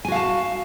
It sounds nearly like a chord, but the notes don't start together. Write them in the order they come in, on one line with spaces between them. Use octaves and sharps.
G#5 F#4 F5 A5